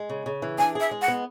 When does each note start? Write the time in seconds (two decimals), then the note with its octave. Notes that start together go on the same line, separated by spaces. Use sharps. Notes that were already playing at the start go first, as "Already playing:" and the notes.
Already playing: G#3
0.09 C#3
0.26 C#3
0.42 E3
0.58 D4 G#5
0.75 G#4 E5
0.91 G#3
1.02 F#5
1.08 B3